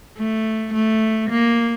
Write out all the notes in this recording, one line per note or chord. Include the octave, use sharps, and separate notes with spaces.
A3
A3
A#3